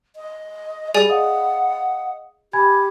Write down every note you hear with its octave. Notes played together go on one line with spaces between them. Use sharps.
D#5
G3 G#4 D5 G#5
D#5 F5 F#5 D#6
G4 G#5 B5 G#6